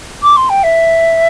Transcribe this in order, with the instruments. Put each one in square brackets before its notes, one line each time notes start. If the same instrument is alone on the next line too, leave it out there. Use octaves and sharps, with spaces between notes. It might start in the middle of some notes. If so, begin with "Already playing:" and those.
[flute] D6
C6
G5
E5